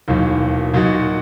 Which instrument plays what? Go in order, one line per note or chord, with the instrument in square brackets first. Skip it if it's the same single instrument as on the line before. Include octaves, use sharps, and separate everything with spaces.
[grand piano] E1 D#2 D#3 F#3 A#3
A#2 F#3 A#3 D#4 F#4